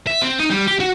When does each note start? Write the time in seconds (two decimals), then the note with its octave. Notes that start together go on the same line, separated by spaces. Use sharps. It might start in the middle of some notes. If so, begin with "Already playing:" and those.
0.07 E5
0.22 C4
0.39 D#4
0.50 G3
0.67 G4
0.80 F#4